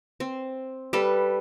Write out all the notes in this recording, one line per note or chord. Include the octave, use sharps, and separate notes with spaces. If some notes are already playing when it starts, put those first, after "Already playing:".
C4
G3 A4 B4